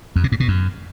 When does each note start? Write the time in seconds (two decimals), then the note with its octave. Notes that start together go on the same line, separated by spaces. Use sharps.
0.16 F2
0.24 C3
0.32 G#2
0.40 B2
0.48 F#2